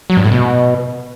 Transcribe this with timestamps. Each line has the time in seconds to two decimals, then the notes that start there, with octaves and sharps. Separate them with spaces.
0.10 F#3
0.17 G2
0.24 A2
0.32 B2